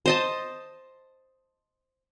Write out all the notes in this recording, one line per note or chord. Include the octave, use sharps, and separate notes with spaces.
C5 D#5 A5